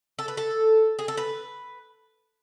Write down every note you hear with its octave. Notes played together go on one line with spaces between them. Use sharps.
A4
B4
A4
G#4
A4
B4